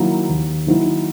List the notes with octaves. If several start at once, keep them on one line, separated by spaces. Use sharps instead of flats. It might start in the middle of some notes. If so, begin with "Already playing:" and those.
Already playing: D#3 F#3 A#3 E4
D#2
D#3 F#3 A#3 E4